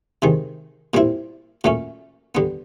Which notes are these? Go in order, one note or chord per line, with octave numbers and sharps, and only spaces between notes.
C3 D#3 G#3
A#2 G3 C4 E4
A#2 F#3 A3 C#4
D3 G3 B3